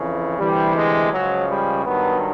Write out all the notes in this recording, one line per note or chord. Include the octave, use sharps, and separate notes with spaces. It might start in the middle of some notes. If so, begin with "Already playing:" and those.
Already playing: F2 C#3 E3
D2 C3 E3 G3
G#3
C#2 C#3 F3 F#3
G3
G2 D#3 F#3 B3